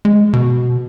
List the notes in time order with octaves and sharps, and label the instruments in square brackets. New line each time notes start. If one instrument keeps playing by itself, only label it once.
[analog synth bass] G#3
B2